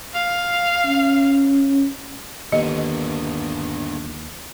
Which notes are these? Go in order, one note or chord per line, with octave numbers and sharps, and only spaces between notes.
F5
C#4
D#2 D3 B3 D#5